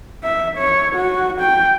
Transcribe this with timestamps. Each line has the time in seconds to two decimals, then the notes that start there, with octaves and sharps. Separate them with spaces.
0.24 E5
0.58 C#5
0.95 F#4
1.41 G5